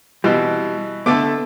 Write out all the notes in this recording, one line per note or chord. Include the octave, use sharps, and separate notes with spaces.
B2 E3 G3 C4
D3 A3 B3 D6